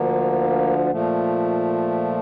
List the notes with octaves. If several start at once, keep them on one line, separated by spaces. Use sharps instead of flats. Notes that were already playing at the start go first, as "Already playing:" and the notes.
Already playing: D2 D3 F3 A#3
A#2 F3 A3